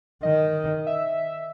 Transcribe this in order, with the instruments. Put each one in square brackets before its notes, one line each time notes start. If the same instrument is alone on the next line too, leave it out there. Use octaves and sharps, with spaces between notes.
[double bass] D#3 [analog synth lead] D#5
[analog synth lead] E5